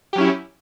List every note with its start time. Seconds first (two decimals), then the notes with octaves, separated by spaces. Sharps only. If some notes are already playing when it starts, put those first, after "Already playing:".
0.13 G4
0.15 F#3
0.18 C#4
0.21 E4